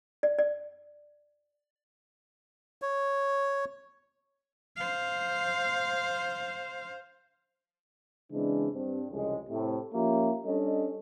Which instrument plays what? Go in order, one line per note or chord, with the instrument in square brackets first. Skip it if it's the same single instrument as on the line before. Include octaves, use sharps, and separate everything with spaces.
[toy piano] D5
D5
[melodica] C#5
[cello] C5 F5
[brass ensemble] C#3 E3 G#3 C4 D4
G2 C4
C2 F2 C#3 G#3
A2 C3
F3 A#3 C#4 F4 G4 E5
G3 C#4 D4 A4 D#5